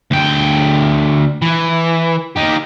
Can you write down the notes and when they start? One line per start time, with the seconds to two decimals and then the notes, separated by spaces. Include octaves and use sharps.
0.11 D2 G5
1.42 E3
2.36 D#4 G4